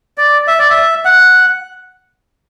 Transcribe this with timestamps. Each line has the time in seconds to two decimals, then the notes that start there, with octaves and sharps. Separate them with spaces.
0.18 D5
0.47 E5
0.59 D5
0.70 E5
1.05 F#5